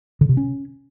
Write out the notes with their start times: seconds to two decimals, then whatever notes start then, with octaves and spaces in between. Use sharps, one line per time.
0.21 D3
0.29 C3
0.37 C#4